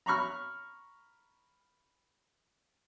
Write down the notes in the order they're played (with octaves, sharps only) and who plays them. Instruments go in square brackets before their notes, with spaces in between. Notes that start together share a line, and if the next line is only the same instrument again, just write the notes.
[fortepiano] A#5 B5 C#6 F6